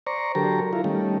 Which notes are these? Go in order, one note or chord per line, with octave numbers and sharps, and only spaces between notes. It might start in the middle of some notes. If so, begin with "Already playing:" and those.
C5 D5 A#5 C#6
D3 F#3 G4 A4 A#4 A#5
E4 F4 A#4
D#3 G3 A3 C#4